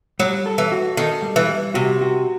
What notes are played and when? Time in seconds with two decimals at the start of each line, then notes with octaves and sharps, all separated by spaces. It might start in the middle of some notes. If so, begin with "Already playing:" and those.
0.20 F#3 G3
0.46 A4
0.58 E3
0.72 F#4
0.97 D#3 A4
1.22 G3
1.36 E3
1.49 G3
1.74 C3 F#4
2.01 F#4